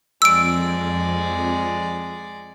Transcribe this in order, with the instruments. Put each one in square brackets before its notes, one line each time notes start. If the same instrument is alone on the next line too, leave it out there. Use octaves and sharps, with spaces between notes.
[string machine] F2 [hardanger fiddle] G#3 D5 [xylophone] E6 D7